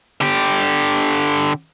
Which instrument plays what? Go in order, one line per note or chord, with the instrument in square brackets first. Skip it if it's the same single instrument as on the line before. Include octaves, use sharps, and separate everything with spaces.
[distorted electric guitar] D3 G4